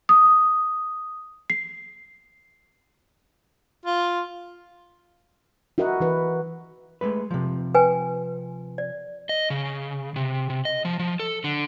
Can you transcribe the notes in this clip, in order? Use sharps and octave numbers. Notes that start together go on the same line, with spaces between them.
D#6
C7
F4
E4 F#4 A#4 D#5 F#5
E3 E4 B4
G#3 A3 B4
C3 F3
B4 G5 G#5
D5
D#5
C#3
C3
C3
D#5
F3
F3
A4
D3